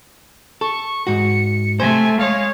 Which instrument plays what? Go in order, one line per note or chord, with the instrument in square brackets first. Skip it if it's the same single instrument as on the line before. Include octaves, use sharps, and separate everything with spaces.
[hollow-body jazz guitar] A4 [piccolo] C#6
[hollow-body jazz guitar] G#2 F#4 [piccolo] C#7
[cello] C3 A3 [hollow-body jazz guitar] C5 [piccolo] G#5
[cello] G#3 C#5 [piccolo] F5